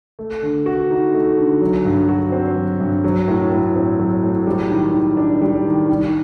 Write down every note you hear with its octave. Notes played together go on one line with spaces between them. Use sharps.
A3
D3
F#4
D#4
A3
D3
F#3
G2
F#4
C4
F#3
G2
F#3
A2
A2
C4
F#3
A2
G3
D#3
D#3
D4
G3
D#3
D#3